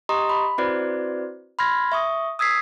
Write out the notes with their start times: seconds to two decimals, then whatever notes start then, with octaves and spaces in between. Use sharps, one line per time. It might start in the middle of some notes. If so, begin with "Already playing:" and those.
0.09 G4 D#5 A#5 C6 C#6 D#6
0.29 B5
0.58 C4 E4 F#4 B4 C5 D5
1.59 B5 C6 F6 G#6 A#6
1.92 E5 C#6 D#6
2.39 D#6 E6 G#6 B6 C7